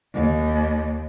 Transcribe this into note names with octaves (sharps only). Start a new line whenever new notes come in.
D#2